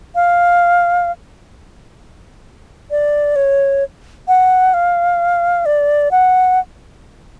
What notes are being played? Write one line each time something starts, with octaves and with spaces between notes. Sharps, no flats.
F5
D5
C#5
F#5
F5
D5
F#5